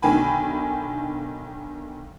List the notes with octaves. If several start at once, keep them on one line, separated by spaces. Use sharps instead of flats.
B1 D3 D#3 G5 G#5 B5